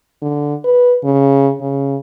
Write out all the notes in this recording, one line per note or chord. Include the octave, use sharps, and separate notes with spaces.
D3
B4
C#3
C#3